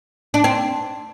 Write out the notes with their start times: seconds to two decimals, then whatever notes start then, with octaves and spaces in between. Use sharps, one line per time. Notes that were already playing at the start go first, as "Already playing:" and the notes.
0.34 D4
0.44 C4